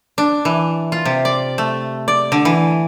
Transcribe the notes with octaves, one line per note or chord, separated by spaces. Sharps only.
D4
E3
F4
C3
D5
A3
D5
D3
E3